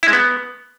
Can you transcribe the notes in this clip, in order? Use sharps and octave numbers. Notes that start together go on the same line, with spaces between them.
E4
G#3
B3